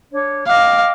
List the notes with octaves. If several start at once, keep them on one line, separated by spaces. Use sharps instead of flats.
D4 C#5
D#5 F5 G5 D6